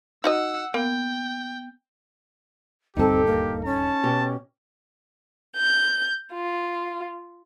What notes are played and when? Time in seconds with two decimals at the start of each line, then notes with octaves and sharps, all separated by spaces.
0.24 D#4 F#4 D#5 F#5 E6
0.74 A#3 B3 G5
2.97 D#1 D2 G2 C4 D#4 G4 A4
3.26 A#3
3.65 C#4 A5
4.03 B2 F#4 G4
5.56 G6
6.33 F4